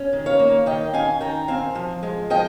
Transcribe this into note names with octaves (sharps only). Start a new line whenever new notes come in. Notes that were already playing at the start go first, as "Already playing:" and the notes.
Already playing: C#4
D#3
C#5 F5
A#3
D#3 D#5 G5
C#4 F5 G#5
D#3 G5 A#5
C4 F5 G#5
F3
G#3
F3 D#5 G5